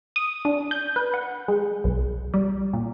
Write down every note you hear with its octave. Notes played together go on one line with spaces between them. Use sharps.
D#6
D4
G6
B4
F#5
G#3
B1
G3
A#2